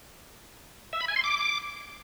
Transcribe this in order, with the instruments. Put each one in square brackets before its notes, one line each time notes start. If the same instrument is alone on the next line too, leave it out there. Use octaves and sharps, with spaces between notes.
[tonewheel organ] E5
B5
G#5
C6
D6